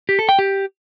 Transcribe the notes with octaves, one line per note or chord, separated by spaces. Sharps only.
G4
A4
G5
G4